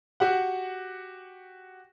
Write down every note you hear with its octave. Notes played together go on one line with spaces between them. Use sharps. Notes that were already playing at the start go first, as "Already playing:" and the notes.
F#4 G4 F#5